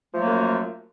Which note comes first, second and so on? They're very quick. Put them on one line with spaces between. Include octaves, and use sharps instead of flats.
F3 A3 F#3 A#3 F#2